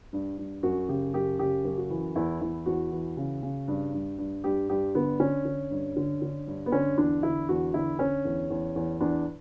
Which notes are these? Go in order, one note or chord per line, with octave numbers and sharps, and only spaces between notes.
G2
G2
F#2 F#4
C#3 G4
F#2 G4
C#3 G4
F#2
F#4
E3
E2 E4
E2 E4
E2 F#4
E3
C#3
C#3
G2
G2
G2
G2 G4
G2 G4
D3 B3
D3 C#4
D3
G2
D3
D3
G2
B3
D3 C#4
E2 D4
D3 E4
E2 F#4
D3 E4
D3 C#4
E2
E2
E2
E2 D4